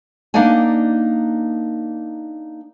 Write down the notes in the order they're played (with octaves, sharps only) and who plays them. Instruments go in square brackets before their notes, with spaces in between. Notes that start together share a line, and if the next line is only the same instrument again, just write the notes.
[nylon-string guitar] A#3 D4 D#4 D5 F#5 G#5